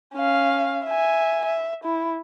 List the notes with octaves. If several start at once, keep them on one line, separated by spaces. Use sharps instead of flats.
C#4 F5
E5 G#5
E5
E4